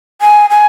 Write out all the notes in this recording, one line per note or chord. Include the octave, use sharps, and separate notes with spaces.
G#5
G#5